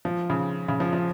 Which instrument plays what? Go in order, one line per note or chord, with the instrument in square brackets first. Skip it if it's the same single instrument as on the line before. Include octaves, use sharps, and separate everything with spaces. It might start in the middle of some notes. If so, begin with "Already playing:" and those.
[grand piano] F3
C#3
C#3
F3
F3